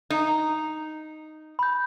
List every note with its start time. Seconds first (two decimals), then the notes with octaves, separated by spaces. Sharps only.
0.10 D#4
1.59 B5 G6